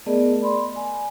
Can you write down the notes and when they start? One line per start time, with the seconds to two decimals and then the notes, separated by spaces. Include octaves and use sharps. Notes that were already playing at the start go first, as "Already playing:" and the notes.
0.06 A3 B3 G#4 A#4 D5 D#5
0.41 D5 B5 C6
0.76 G#5